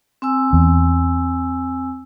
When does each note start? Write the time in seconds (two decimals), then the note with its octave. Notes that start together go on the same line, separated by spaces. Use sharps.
0.22 C4 G#5 E6
0.53 E2